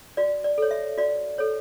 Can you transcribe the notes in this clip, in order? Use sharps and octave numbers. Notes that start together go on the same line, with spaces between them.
F#4 D5
D5
A4 C#5
E5
F#4 D5
A4 C#5